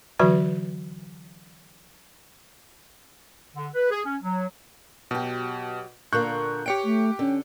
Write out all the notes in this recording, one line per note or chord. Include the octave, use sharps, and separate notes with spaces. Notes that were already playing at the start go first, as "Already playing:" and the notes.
D3 E3 F#3 F#4 B4
D3
B4
G#4
C#4
F#3
B2 F#3 G4
A#2 D3 A#3 C#6 F#6 G6
G4 C#5 G5 C#7 D7
A3
D3 C#4